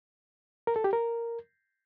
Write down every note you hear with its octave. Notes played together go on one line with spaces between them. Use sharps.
A#4
A4
G4
A#4